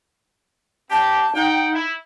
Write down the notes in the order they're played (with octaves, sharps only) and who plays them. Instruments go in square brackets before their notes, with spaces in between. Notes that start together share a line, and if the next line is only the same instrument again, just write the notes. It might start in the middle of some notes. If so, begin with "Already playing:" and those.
[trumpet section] C4 G4 [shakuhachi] A5
[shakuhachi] D#4 [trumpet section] F#5 G5
[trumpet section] E4